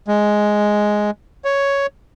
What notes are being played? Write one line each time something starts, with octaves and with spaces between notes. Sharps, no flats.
G#3
C#5